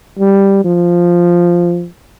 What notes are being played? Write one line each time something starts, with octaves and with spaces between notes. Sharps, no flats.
G3
F3